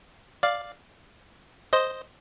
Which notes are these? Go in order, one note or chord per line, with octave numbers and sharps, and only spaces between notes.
D5 F5
C5 D#5